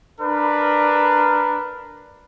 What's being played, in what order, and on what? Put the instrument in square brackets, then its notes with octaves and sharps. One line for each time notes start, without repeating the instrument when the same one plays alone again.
[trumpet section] D4 A#4 B4